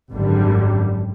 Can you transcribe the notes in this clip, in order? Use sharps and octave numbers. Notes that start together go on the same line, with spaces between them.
G#1 F#2 D3 G3